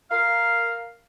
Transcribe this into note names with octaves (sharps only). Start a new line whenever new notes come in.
A#4 F5